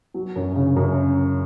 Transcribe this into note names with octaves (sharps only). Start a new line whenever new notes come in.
F#3
F#2
C#3
F#2